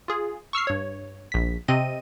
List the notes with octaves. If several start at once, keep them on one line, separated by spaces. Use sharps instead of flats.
F4 G#4
C#6 E6 F6 C7
G2 C#5
A#1 B6
C3 C4 D#5 D#7